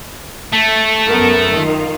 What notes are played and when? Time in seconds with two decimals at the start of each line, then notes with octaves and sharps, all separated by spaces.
0.52 A3
1.07 F#2 B3 A#4
1.52 D#3 F4